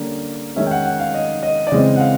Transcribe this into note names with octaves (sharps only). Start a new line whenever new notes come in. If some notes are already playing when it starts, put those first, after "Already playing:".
Already playing: D3 G3 A#3 C#4
D#3 G#3 C#4 E5
G5
F#5
F#5
F5
D#5
D#5
D5
C#3 E3 G#3 C4 D#5
F#5
F5